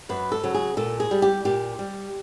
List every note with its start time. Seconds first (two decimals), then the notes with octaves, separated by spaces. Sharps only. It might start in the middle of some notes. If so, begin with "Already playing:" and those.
0.09 F#2 B4
0.32 A4
0.43 C#3 F#3
0.54 G#4
0.77 A#2 A4
1.00 G#4
1.11 G3
1.22 G4
1.45 A#2 G4
1.79 G3